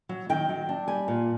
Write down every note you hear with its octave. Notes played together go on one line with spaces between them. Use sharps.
F#3
D#3 G5
F#3
D4
G3 G#5
A#2